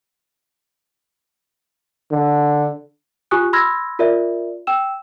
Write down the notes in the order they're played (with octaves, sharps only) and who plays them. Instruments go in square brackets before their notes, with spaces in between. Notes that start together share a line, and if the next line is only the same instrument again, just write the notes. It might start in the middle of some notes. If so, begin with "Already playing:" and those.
[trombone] D3
[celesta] F4 G4 G#5 C#6 D#6 F#6
B5 C6 E6 F6 G#6 A#6
F4 A#4 D5 E5
G5 E6 E7